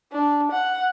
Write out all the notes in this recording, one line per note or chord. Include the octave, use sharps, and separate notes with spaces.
D4
F#5